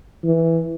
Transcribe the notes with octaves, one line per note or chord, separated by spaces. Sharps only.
E3